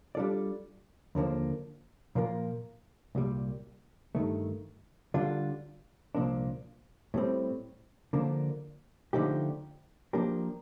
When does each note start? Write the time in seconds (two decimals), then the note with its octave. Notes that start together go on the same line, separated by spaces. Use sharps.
0.15 G3 D4 F4 A4 D5
1.15 D#2 D3 F3 A#3 D4
2.15 A#2 F3 A#3 F4 A#4
3.15 C2 A#2 G3
4.15 G2 D#3 A3
5.14 D3 G3 D4 F4
6.15 C2 A#2 F3 A#3 D4
7.14 A2 G3 C4
8.13 D3 F3 A#3 D4
9.13 D3 F3 A3 D#4 G4
10.13 F3 A#3 D4 G4 A#4